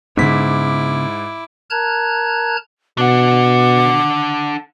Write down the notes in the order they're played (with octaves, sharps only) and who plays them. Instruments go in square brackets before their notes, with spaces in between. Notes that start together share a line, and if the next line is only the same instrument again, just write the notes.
[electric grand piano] G#2 B6 [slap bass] C#3 B3 D4 [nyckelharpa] E4 D6
[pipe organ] A#4 A5 A#5 F#6 G#6
[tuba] B2 [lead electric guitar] D4 F#5 [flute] D6